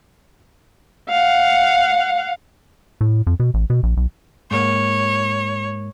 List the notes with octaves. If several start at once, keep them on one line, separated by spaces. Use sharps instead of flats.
F5 F#5
A2
F2
B2
A1
B2
A#1
B1
G#2 A#3 C#5